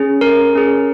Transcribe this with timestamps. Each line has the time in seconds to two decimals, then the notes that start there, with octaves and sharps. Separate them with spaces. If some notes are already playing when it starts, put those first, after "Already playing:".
Already playing: C#4 G#4
0.21 A#4
0.55 C#4 G#4